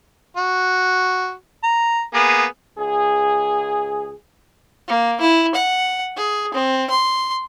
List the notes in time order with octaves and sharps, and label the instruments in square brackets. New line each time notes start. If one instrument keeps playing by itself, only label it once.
[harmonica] F#4
A#5
A#3 B3 G#4
[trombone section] C#2 G#4
[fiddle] A#3
E4
F#5
G#4
C4
C6